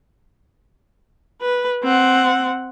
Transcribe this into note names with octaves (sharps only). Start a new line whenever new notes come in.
B4
C4 F#5